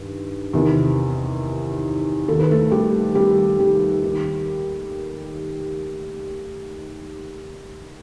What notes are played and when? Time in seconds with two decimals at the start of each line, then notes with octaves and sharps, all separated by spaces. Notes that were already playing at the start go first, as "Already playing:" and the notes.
Already playing: G2 D#3
0.53 E2 C3 D#3
2.28 D#2 D#3 A4
2.39 B4
2.51 A3 A4
2.72 G3 G4
3.15 G3 G4
3.59 G3 G4
4.03 D#2 D#3